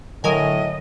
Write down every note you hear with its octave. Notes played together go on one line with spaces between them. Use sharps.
A2 D3 F#3 A#4 D#5 G#5